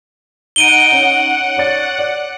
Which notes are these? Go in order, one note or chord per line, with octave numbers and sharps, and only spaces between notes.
D#4 F#5 D7 D#7 G7
C#4 F#5
C#5 D5 A6
D5